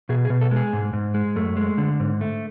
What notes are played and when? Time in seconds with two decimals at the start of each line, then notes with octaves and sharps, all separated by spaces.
0.09 B2 G#4
0.25 G#4
0.30 B2
0.41 A4
0.51 G#3 G#4
0.73 G#2
0.93 G#2
1.14 G#3
1.36 F#2 A3
1.57 G#3
1.78 D3
2.00 G#2
2.21 A3